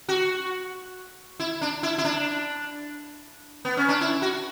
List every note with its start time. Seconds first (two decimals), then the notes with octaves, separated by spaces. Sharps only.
0.09 F#4
1.40 E4
1.61 D4
1.83 E4
1.98 E4
2.05 D4
3.65 B3
3.77 C#4
3.89 D4
4.01 E4
4.22 F#4